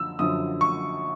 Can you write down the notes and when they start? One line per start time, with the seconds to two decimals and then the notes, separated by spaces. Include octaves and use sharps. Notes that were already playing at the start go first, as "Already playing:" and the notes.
Already playing: F#2 D3 F3 E6
0.19 F#2 D3 F3 D#6
0.61 C#6